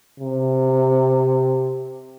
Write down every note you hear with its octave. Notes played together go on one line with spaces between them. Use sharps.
C3